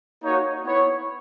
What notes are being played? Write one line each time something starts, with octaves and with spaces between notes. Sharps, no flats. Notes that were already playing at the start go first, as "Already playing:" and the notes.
A#3 D#4 F#4 C#5
B3 E4 C#5